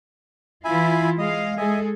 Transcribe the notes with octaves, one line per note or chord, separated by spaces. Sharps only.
E3 E4 F4 E5 G#5 B5
G#3 D#5 F5
G#3 G#4 A4 D#5 E5 G#5